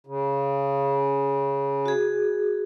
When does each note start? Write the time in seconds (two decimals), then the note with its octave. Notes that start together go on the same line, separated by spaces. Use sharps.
0.07 C#3
1.86 F#4 G#4